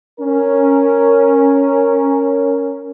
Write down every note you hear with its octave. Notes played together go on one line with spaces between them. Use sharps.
C#4 A#4